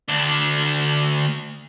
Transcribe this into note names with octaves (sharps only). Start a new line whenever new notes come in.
D2 D4